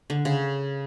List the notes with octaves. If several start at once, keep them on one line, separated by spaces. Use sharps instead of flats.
D3
C#3